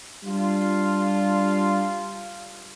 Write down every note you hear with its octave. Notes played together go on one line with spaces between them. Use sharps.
G3 D4 F4